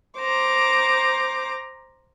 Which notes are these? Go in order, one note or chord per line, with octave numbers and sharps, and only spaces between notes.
C5 A#5 D6